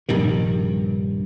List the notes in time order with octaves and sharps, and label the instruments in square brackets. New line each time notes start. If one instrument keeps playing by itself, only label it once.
[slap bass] A#1 G2 C3 D#3